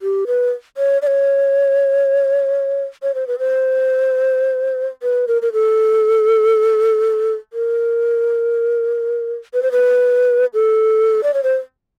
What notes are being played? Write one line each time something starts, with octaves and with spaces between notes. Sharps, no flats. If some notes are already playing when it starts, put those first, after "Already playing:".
G4
B4
C#5
D5
C#5
C#5
C5
B4
C5
B4
A#4
A#4
A4
A#4
B4
C5
B4
A4
D5
C#5
C5